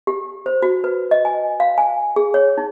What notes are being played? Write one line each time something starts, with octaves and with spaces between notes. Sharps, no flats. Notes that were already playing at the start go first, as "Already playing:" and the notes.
G4
C5
F#4
B4
D#5
G#5
F5
G#5
G#4
C#5
D#4